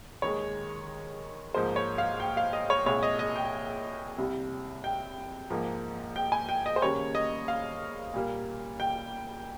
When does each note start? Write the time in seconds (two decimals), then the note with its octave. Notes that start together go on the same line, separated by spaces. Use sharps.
0.22 D#2 D#3 G#3 C#5
1.54 G#2 F3 A#3 C5
1.76 C#5
1.98 F5
2.20 G5
2.37 F5
2.53 D#5
2.70 C#5
2.86 C2 A#2 G#3 C#5
3.03 D#5
3.19 D#5
3.36 G5
4.18 C2 C3 G3
4.84 G5
5.50 G#2 F3 A#3
6.16 G5
6.32 G#5
6.49 G5
6.66 D#5
6.76 C5
6.82 D#2 C#3 G3 A#3 C#5
7.15 D#5
7.48 F5
8.14 A#2 G3 A#3
8.80 G5